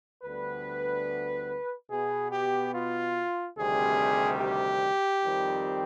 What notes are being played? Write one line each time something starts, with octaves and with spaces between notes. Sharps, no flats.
D2 D3 G3 B3 B4
B2 B3 G#4
G4
F4
D2 C3 D#3 G3 C4 G#4
G4
F2 D#3 G3 C4